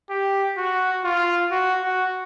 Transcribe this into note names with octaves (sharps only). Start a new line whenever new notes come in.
G4
F#4
F4
F#4
F#4